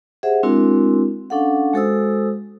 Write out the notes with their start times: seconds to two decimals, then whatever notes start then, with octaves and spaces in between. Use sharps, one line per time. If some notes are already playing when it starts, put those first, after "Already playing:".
0.23 G4 G#4 C5 E5 F#5
0.43 G#3 C4 D4 E4 F#4 A#4
1.30 C#4 D4 A4 F5 F#5
1.73 G#3 F#4 A4 C5 D#6 E6